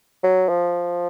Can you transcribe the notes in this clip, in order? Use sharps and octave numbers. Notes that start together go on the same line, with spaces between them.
F#3
F3